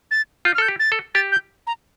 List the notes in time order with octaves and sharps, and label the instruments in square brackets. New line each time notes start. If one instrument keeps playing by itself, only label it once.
[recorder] A6
[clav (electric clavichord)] F4 [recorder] G6
[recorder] F6
[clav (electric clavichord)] A4 [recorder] G6
[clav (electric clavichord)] G4
[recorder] A6
[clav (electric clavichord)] A4
[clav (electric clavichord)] G4 [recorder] A6
[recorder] G6
A#5